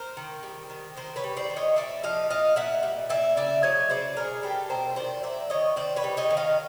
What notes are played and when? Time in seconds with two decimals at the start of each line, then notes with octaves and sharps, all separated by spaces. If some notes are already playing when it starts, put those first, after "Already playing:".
Already playing: A#4 C5
0.17 D#3
0.43 G3
0.70 D#3
0.97 D#3 A#4 C5
1.16 B4 C#5
1.24 G3
1.37 C5 D5
1.50 D#3
1.56 C#5 D#5
1.76 A#2 D5 E5
2.04 F3 D#5 F5
2.30 A#2 D#5 F5
2.56 A#2 E5 F#5
2.83 G3
3.10 A#2 D5 E5
3.37 C#3 D5 E5
3.63 F#3 C#5 D#5
3.90 C#3 C5 D5
4.17 B2 G#4 A#4
4.43 G3 G4 A4
4.70 B2 A#4 C5
4.96 D#3 C5 D5
5.23 F#3 D5 E5
5.50 D#3 C#5 D#5
5.76 D#3 C5 D5
5.96 B4 C#5
6.04 G3
6.17 C#5 D#5
6.30 D#3
6.37 D#5 F5